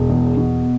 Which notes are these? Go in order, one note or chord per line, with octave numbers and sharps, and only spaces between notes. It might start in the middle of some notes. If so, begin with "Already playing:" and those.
Already playing: E1
E2
B2